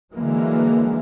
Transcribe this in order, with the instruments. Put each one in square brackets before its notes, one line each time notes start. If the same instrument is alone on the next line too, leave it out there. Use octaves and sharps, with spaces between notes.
[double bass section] D3 E3 F#3 G#3 A#3